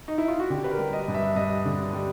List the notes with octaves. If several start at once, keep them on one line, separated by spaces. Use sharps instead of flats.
D#4
E4
F4
F#4
D3 G4
B4
A#4
G3
D#5
G2
E5
G2 D#5
D3
G3